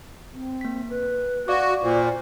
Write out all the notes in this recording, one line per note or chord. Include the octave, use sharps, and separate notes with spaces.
C4
A#3 B6
B4
F#4 D5 F5 D6
A#2 C5